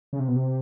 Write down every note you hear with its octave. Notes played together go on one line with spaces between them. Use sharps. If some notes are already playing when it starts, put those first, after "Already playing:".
C#3
C3
B2
C3